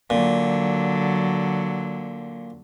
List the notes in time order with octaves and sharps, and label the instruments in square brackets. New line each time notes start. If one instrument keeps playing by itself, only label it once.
[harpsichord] A#2 [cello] D3 F#3